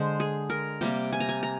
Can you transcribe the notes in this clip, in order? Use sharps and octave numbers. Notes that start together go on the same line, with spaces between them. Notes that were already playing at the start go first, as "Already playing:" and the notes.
Already playing: D3 G#3 C5
G#4
A#4
C3 G3 A#3 G5
G#5
A#5
G#5
A#5